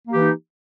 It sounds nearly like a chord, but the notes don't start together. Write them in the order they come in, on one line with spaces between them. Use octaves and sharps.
A#3 G4 E3 D#4